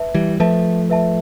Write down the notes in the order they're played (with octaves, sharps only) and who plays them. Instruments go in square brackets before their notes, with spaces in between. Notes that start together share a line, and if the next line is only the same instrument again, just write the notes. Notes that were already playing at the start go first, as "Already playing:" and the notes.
Already playing: [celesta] B4 E5 A5
[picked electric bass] E3 G3
[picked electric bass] F3 A3 [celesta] B4 E5 A5
[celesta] B4 E5 A5